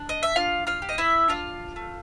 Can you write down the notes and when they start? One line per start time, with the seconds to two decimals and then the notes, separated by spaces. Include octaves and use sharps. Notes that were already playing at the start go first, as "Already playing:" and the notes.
Already playing: D4
0.09 D#5
0.23 E5
0.36 D4 F4 F5
0.67 F4 F5
0.82 G4
0.89 D#5
0.98 E4 E5
1.28 D4 F4 F5
1.76 A3